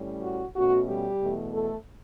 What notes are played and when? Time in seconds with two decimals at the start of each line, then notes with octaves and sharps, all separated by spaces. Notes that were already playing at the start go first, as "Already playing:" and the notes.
Already playing: A2 G3 C#4
0.23 F#4
0.56 B2 A3 C#4 F#4
0.88 G3 G4
1.21 E2 B2 A3
1.53 A3 A4